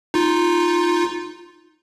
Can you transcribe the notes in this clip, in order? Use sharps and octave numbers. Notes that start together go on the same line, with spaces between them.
D#4 F4